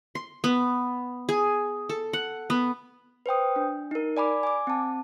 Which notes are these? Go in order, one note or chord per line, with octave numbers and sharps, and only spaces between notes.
C6
B3
G#4
A4
F#5
B3
B4 C5 G5 D#6
D4
D#4 A#4
D5 G#5 B5 D6
G#5 D6
C4 A5